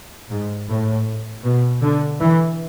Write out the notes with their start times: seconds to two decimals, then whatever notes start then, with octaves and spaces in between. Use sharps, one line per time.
0.30 G#2
0.69 A2
1.44 B2
1.83 D3
2.20 E3